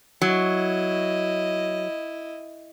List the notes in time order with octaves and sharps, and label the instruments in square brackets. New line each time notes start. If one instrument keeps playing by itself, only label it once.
[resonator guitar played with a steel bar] F#3 [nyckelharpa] E4 D#5